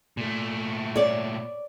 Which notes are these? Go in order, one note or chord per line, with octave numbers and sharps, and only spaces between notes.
A#2 A3
C#5 D5